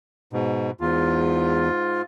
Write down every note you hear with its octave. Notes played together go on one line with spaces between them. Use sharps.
G#2 B2
E2 G#2 F4